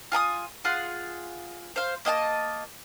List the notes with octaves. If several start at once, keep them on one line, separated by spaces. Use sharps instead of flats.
F4 G#5 A#5 D#6
F4 G#4 F#5 C6
C5 F5
A#3 D#5 F#5 A5